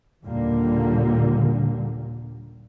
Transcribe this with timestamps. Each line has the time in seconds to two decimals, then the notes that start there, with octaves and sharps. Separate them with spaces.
0.24 D#2 A#2 D3 G3 A#3